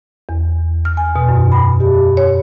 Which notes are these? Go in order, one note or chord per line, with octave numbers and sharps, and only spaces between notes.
E2
F6
G#5
B2
F#2
B5
G4
C#5